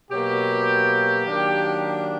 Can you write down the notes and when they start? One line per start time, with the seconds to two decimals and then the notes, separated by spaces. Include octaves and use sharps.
0.11 B2 F#3 A#3 G4
1.24 D#3 F#3 A#3 D4